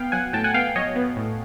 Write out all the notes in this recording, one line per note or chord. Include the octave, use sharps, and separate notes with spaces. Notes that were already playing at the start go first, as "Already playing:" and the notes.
Already playing: B3 F5 G5
F#3 F#5 G#5
A2 G5 A5
F#5 G#5
B3 F5 G5
F#3 C#5 D#5
B3
A2